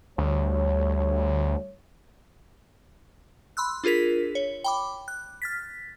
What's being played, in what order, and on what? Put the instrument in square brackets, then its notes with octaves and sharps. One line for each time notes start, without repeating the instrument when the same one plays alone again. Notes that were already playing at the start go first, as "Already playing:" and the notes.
[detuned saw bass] D2 [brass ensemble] G3 A3 C#5
[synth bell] B5 C6 E6 F#6
D4 F4 G#4 A#4 B6
C#5
G5 B5 D6
F#6
F6 A6 B6